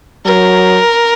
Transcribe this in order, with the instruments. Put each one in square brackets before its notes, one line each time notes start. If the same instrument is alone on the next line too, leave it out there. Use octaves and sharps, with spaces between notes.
[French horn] F#3 [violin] A#4